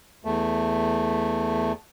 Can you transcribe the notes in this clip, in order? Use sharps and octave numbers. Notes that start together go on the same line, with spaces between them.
E2 A3